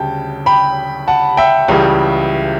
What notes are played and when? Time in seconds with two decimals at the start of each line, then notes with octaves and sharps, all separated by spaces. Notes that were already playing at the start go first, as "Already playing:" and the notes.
Already playing: D2 C#3 G3 G5 A5
0.46 G5 B5
1.08 F#5 A5
1.37 E5 G5
1.68 C#2 C#3 E3 G3